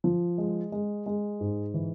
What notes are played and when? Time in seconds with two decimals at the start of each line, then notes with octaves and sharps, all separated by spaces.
0.04 F3
0.38 G#3
0.72 G#3
1.06 G#3
1.40 G#2
1.74 E3